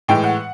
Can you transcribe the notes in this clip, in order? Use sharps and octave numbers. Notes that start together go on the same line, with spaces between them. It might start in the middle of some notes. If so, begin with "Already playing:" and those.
A2 E3 G#3 G5
F#5